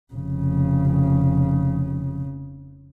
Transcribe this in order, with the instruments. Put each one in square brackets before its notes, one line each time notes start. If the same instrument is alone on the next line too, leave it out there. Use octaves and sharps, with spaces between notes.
[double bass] F1 C#3